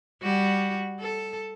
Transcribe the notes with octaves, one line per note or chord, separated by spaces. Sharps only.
G3 F#4
A4